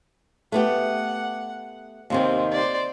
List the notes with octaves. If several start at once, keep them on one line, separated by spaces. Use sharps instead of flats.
A3 B3 G4 F#5
D#2 C3 D#3 C4
C5 D5